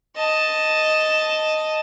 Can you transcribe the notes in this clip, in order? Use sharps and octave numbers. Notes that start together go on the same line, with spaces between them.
D#5 A5